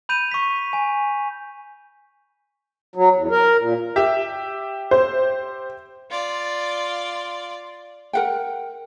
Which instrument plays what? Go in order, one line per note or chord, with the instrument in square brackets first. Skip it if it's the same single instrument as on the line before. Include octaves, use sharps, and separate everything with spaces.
[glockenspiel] B5 G6 D#7 F7
C#6 B6
G#5
[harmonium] F#3
E2
A#4
A#2
[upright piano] G4 E5
[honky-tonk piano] C5
[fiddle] F4 D5
[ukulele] A#4 F#5 G5